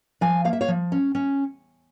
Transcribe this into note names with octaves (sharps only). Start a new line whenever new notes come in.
F3 F5 G#5
A#3 F5
E5
C#5 F5
F3
C#4
C#4